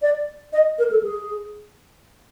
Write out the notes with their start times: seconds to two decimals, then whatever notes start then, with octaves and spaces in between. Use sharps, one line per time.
0.02 D5
0.53 D#5
0.78 A#4
0.91 A4
1.03 G#4